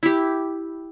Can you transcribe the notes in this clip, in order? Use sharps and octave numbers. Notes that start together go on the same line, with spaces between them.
E4 G4